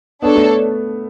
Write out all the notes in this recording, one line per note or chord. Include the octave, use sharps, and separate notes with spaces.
B3 D4 A4 C#5
A3